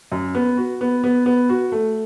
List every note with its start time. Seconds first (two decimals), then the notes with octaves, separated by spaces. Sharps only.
0.12 F#2
0.35 B3
0.57 F#4
0.81 B3
1.04 B3
1.26 B3
1.49 F#4
1.72 A3